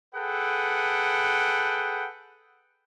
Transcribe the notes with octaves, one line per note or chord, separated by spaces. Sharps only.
G#4 A4 B4 F#5 G5